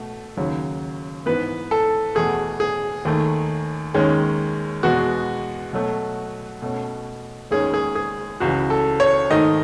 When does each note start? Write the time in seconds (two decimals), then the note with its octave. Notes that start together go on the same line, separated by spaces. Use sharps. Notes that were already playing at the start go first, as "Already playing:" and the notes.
Already playing: B2 A3
0.37 D#2 C#3 F#3
1.26 G#2 E3 B3 B4
1.71 A4
2.15 E2 B2 A3 G#4
2.60 G#4
3.05 D#2 D#3 A3
3.94 D#2 D#3 G#3 C#4
4.83 E2 B2 G#3 B3 F#4
5.73 B2 F#3 A3
6.62 B2 A3 C#4
7.51 D#2 D#3 G#3 C#4 G#4
7.74 G#4
7.95 G#4
8.40 C#2 C#3 E3 F#4
8.70 A4
9.00 C#5
9.30 G#2 D#3 A3 D#5